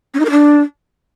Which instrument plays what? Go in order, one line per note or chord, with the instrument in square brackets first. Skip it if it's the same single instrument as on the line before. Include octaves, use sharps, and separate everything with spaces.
[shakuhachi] C#4
D#4
A#4
D4